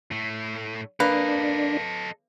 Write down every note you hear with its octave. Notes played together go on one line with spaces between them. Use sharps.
A2 A3
A#3 D4 A4 B4 D#5